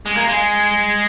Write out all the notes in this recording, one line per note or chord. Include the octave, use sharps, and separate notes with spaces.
G#3
A#3
G#3